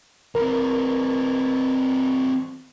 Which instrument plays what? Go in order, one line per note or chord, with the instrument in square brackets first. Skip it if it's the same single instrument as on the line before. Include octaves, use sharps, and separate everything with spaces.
[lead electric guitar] E3 C4 [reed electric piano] A#4